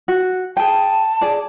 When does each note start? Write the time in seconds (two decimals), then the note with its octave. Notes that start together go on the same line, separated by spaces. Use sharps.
0.08 F#4
0.57 G#4 G5 A5
1.21 G#4 D5